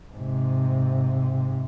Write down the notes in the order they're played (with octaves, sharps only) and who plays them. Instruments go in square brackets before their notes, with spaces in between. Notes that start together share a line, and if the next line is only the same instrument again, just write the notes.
[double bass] G#2 C3